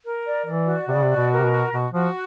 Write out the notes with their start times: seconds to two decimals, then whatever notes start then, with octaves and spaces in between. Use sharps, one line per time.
0.05 A#4
0.25 D5
0.46 E3 D5
0.67 F#4
0.88 C3 D5
0.96 C#3
1.04 C3
1.10 F#4
1.16 B2
1.31 A#4
1.39 C3
1.44 B2
1.52 F#4
1.72 B2 F#4
1.93 F3 F#4